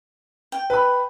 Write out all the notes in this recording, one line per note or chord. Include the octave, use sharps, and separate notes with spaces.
G5
B4 B5